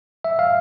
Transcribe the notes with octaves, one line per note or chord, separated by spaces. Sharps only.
E5
F5